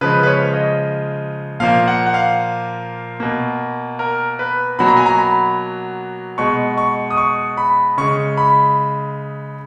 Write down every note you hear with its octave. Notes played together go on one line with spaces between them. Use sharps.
C#3 F3 G#3 B4
B4
C#5
D#5
A#2 F3 A#3 F5
F#5
F#5
F5
B2 A#3
A#4
B4
B2 F#3 A#3 B5
A#5
G#5
A#5
B5
B2 G#3 C#6
C#6
D#6
C#6
B5
C#3 G#3 C#6
B5